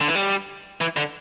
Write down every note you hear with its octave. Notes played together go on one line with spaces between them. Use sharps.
D3
E3
G3
E3
D3